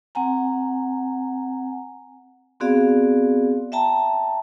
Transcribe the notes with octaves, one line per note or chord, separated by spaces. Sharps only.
C4 F#5 G#5 A#5
B3 C4 F#4 G#4 D5 F5
E5 G5 A5 A#5